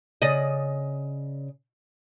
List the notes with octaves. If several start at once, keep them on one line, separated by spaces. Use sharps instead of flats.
C#3 D5 D#5